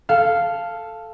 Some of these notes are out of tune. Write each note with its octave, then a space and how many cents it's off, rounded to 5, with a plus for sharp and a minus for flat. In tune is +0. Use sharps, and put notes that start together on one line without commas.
A4 +0 F5 -5